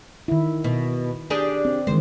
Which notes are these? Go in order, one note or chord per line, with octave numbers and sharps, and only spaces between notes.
D#3 E4
B2
D4 G4 G#4
C4
D#3 E3 G#3 C5